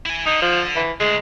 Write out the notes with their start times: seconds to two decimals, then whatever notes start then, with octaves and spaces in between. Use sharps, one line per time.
0.06 E4 G#5
0.26 D3 D#4
0.42 F3
0.76 E3
1.00 D2 G#3